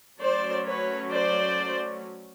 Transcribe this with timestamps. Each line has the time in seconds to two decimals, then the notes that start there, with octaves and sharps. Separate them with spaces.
0.19 F#3 A3 C#4 C5 D5
0.66 B4 C#5
1.11 C5 D5